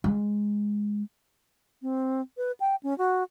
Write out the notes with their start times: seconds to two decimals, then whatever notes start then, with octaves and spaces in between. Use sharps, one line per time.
0.04 G#3
1.82 C4
2.37 B4
2.60 G5
2.83 C#4
2.98 F#4